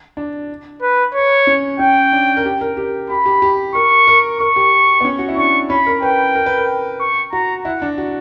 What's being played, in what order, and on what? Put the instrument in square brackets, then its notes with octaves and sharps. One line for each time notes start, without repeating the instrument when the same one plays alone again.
[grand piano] D4
[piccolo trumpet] B4
C#5
[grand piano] C#4
[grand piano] C#4 [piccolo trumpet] G5
[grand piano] D4
A#4
G4
A#4
G4
[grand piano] G4 [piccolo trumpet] B5
[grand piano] G4
G4
[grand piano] A#4 [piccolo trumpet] C#6
[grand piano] A#4
[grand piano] A#4 [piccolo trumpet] C#6
[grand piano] G4
B3
C#4
F#4
E4
[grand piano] D4 [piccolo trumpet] C#6
[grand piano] C#4 [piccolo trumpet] B5
[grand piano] A#4
[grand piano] B4 [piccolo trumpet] G5
[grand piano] A#4
B4
A#4
[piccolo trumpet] C#6
[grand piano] F#4 [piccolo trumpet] A#5
[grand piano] E4 [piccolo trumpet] F#5
[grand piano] D4
F#4